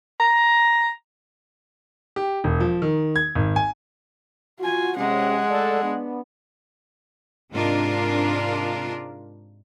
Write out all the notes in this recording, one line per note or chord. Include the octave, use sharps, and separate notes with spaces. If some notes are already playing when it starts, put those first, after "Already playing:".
A#5
G4
E1
F3
D#3
G#6
G#1
G#5
F4 F#4 G#5
C3 G#3 C#4 F#5
A3 A4 D5
B3 D4
G#2 C3 G#3 D4 F4 A#4